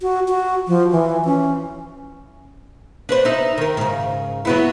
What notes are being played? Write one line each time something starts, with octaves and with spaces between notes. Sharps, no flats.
F#4
F#4
F3
E3
C#4
D4 B4 C5
D#4 E5
D#3 A#4
G#2 C#3
F#3 B3 E4